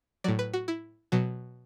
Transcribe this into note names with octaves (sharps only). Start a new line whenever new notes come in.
A2 F#3 D5
B4
F#4
E4
B2 F#3